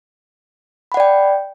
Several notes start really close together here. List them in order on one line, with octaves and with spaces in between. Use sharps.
B5 F#5 D5 G5